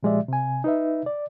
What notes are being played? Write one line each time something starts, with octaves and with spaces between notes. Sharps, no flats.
A#2 F3 G#3 G4 D5 E5
C3 G#5
D#4 B4 E5
D5